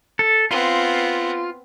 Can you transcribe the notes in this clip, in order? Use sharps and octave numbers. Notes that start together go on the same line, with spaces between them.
A4
B3 C4 F4